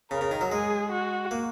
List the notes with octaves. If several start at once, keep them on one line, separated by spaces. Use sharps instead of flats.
C#3 A#4
C#3
D#3
F#3
G#3 G#4
F#4
A#3